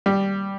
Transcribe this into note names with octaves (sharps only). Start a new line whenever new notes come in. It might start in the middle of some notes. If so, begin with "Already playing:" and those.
G3